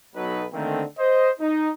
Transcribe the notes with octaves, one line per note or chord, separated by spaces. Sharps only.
B1 F#3 B3 D#4 A4 B4
D3 D#3 A3 A#3 C4
C5 D#5
D#4